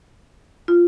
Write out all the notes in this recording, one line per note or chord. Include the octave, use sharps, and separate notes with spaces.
F4